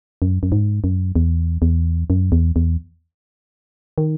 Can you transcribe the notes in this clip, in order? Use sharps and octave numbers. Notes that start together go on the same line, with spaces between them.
F#2
F#2
G#2
F#2
E2
E2
F#2
E2
E2
D#3